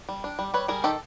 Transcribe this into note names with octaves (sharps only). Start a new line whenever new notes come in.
G3
D4
G3
G3 B4 C#5
G3 G#4 A#4
D#3 G4 A4